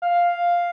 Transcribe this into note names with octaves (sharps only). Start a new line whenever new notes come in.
F5